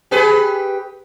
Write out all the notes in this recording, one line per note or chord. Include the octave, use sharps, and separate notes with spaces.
G4 G#4 B4